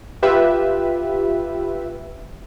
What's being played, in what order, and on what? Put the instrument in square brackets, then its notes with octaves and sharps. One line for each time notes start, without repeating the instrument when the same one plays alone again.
[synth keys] F4 G4 B4 E5